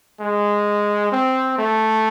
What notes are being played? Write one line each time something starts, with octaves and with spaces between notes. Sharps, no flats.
G#3
C4
A3